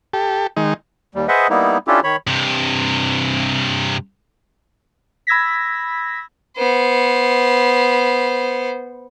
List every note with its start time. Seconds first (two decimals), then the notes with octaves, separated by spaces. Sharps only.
0.13 G4 A4
0.57 D#3 G#3 D#4
1.15 D#2 G3
1.28 G#4 B4 C5 D#5 E5 F#5
1.50 G3 A#3 B3 D#4 E4
1.87 C#4 D4 E4 F4 G4 A4
2.04 D#3 C#5 B5
2.27 G2 C3
5.27 B5 E6 G#6 A#6 B6
6.57 B3 C5